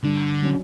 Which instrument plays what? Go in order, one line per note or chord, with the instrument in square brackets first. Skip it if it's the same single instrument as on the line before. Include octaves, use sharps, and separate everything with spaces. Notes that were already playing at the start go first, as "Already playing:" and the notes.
[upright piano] G2 [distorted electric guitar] D3
[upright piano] F#3 C#4